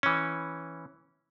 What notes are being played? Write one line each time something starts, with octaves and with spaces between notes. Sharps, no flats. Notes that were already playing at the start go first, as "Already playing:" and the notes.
E3 C#4